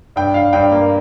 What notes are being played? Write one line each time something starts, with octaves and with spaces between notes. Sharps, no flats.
G2 G5
G2 F5
G2 G5
A#3